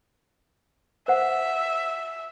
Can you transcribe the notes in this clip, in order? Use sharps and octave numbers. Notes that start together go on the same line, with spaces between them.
C5 E5 F#5